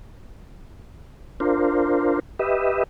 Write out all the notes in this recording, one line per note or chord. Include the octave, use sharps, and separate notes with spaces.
D4 F4 A#4 C5
G4 B4 D#5 E5